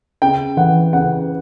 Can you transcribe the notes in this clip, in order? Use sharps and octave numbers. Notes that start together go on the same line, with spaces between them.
C#3 G5
E3 F#5
C#3 F#5